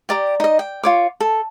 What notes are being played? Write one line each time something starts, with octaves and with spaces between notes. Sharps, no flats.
G4 D5 A#5 D6
D#4 D#5
G5
F4 C#5 D6
A4